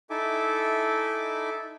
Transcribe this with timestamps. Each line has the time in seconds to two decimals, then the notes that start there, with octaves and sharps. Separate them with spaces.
0.10 D#4 E4 A4 E5 G#5 D6